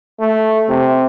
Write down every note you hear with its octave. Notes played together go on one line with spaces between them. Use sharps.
A3
C3